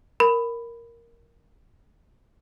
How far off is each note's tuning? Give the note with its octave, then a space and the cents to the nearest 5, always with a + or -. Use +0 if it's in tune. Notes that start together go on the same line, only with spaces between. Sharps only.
A#4 +0 B5 +10